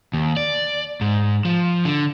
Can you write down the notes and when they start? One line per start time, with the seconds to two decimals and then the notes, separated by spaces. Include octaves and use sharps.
0.13 D#2
0.37 D5
1.01 G#2
1.45 F3
1.85 D3